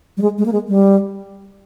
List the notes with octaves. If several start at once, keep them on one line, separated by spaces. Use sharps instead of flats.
G3
G#3
G#3
A#3
G#3
G3